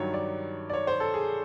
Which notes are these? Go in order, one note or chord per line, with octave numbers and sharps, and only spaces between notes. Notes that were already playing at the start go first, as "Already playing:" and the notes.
Already playing: G2 D#3 F#3 C#5
D5
D5
C#5
C5
A4
G#4